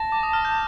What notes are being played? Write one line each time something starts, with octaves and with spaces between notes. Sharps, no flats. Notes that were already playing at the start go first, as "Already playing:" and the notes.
Already playing: A5 A#6
D6
D#6
F6
G6